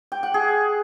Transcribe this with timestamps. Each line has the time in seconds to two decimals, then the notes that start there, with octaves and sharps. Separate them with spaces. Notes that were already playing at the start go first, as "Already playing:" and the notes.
0.12 G5
0.23 F#5
0.34 G#4